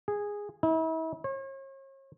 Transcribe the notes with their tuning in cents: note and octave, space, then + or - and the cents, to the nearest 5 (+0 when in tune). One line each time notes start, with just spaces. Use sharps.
G#4 -10
E4 -40
C#5 -40